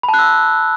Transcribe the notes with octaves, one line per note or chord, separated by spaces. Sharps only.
B5
A5
F#6
E6